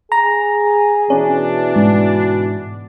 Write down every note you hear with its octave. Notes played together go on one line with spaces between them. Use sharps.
G#4 A#5
B2 E3 C#4 D4
G#2 F#4